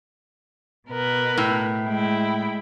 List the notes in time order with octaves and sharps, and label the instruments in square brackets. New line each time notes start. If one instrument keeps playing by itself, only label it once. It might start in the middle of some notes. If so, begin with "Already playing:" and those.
[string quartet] B2 A#4 B4
[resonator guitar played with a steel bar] A2
[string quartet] G#3 E4 G5